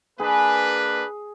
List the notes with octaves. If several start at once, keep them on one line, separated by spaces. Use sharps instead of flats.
A#3 D4 G#4 B4